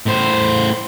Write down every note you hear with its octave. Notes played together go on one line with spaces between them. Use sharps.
A2 C5